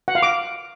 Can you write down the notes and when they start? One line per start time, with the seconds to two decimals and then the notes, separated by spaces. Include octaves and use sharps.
0.08 F#5
0.15 F5
0.23 D6